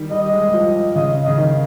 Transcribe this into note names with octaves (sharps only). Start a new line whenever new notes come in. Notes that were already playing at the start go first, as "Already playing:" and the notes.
Already playing: D#3 G3
G3 D#5
G#3
G3
F3
C#3 D#5
C#3 D#5
D#3